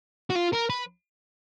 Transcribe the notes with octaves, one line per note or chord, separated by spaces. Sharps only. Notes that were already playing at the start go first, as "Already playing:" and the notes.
F#4
F4
A#4
B4